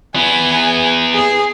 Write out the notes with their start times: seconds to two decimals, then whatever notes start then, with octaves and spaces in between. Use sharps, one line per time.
0.16 B3 E4 G#5
1.14 G#4